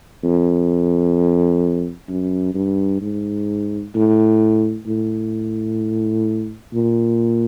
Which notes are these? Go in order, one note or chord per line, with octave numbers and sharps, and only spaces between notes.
F2
F#2
G2
G#2
A2
A2
A#2